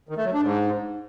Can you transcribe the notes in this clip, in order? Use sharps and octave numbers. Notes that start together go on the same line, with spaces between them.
D#3
A3
F#3
D4
G#2